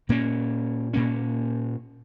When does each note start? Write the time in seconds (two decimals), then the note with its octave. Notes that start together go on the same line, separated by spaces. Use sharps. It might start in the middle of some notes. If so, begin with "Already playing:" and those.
0.09 A#2 A#3 C#4
0.93 A#2 A#3 C#4